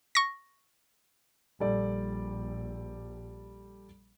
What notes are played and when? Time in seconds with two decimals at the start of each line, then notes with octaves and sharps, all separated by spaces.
0.15 C#6 A#6
1.60 A#1 G3 A4 D5